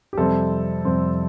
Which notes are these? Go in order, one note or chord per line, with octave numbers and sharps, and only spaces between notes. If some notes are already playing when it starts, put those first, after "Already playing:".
G4
F2 C3 G3 C4 A4
F2 C3 G3 C4